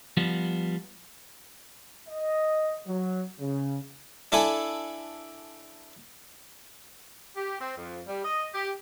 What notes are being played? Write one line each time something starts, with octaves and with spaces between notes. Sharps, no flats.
F3 G3 B3
D#5
F#3
C#3
D4 E4 A4 G#5
G4
C4
F2
G3
D#5
G4